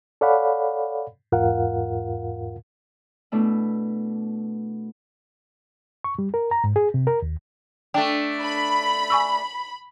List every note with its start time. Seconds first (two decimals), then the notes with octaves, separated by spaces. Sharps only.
0.21 A4 C#5 D5 F5 F#5 B5
1.32 E2 G#2 F4 A#4 F5 F#5
3.32 B2 A3 D4 E4
6.04 C#6
6.19 G3
6.34 A#4
6.51 A#5
6.64 G#2
6.76 G#4
6.94 C3
7.07 A#4
7.22 D#2
7.94 A3 D4 G5
8.42 B5
9.10 G#5 C#6 E6